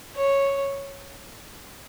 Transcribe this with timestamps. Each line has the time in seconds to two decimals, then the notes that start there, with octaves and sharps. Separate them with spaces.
0.16 C#5